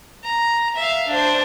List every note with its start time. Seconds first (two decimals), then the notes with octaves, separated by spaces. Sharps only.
0.23 A#5
0.76 E5 F5
1.08 D4 C5